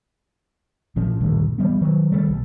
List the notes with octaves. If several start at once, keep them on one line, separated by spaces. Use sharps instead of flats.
A1 A#2 F3 C#4
D2 G2 A#2 D#3
E3 G3 B3
D#3 F#3
D#3 G3 A3
B1